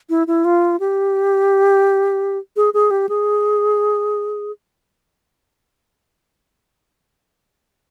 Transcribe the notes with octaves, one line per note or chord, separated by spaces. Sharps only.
E4
E4
F4
G4
G#4
G#4
G4
G#4